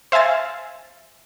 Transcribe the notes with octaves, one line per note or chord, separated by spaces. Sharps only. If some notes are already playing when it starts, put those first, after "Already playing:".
C5 E5 F5 G#5 A6